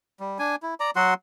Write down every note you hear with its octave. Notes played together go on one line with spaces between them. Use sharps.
G3
D4 G#5
E4
D5 A#5
F#3 F#4 F#5 C6